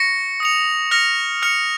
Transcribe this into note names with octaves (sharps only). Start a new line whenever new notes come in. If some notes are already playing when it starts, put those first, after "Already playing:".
Already playing: C#6 A#6 C#7
D#6 C#7 F7
F6 A#6 C#7 F7
F6 C#7 F7